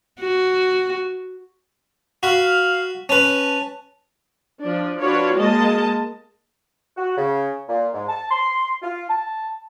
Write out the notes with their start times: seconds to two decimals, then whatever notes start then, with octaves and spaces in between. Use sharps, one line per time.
0.20 F#4
2.23 F#4 F5 B5
3.09 C#4 B4 A5
4.62 F3 D4
5.00 D4 F4 F#4 B4 C#5
5.35 G#3 A#3 D#5 A5
6.97 F#4
7.17 C#3
7.69 A#2
7.94 G#2
8.09 A5
8.31 C6
8.82 F4
9.09 A5